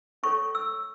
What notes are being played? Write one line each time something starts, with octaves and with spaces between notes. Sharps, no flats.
C#4 A4 C#5 C#6
E6